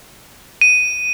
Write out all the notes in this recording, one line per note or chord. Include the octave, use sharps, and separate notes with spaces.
D#7